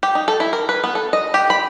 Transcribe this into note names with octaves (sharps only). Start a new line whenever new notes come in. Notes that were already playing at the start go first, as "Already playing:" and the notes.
G4
D#4
A4
E4
A#4
B4
B3
A4
D#5
G4
B5